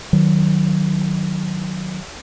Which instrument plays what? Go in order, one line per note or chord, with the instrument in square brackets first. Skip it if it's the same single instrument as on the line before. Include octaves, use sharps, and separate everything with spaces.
[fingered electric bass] D#3 F#3